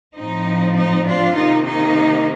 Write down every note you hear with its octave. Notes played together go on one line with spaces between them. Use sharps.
A2 F3 C4 D#4
D#4
D4 F4
C3 D#3 A#3 D#4
D#4